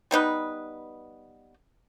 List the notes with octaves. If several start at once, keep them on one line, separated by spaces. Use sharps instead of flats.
G3 B3 D#4 B4